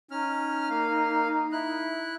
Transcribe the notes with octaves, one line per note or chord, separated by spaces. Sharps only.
C#4 D#4 F6
A#3 F5
E4 F#6